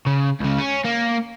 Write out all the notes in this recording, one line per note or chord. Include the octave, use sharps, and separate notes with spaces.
C#3
C#2 C#3
C#4
A#3